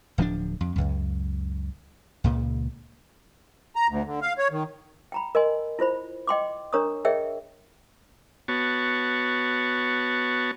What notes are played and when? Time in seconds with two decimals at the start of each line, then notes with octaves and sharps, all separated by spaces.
0.18 D1 F3 C4 D4
0.61 F2
0.76 C#2 F#2
2.24 C#2 A#2 C#3
3.76 A#5
3.88 D2
4.05 D3
4.21 F5
4.38 C#5
4.51 D#3
5.12 G5 A#5 B5
5.35 A#4 D#5 G#5 C6
5.79 E4 F4 C5 B5
6.27 D#5 G5 C6 D6
6.73 D4 A#4 C#5 A#5 C#6 D#6
7.05 G#4 A#4 C#5 D#5 E5 G5
8.48 B3 F#4 C#5 A5